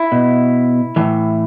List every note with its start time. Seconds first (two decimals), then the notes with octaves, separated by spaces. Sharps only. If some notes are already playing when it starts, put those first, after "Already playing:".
Already playing: E4
0.12 B2
0.96 A2 E3